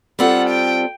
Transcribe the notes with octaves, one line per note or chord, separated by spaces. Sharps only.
G3 C4 F4 A4 F#5
G5